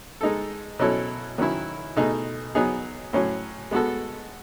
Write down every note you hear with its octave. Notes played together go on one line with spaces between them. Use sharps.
G#3 D#4 A4
B2 F#3 C#4 E4 A4
D#3 F#3 C#4 E4
B2 A3 D#4 G#4
F#3 B3 D#4 G#4
A2 F#3 C#4
G#3 B3 F#4 A4